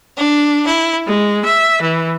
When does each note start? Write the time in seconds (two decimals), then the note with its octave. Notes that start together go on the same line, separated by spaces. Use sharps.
0.16 D4
0.67 E4
1.07 G#3
1.45 E5
1.82 E3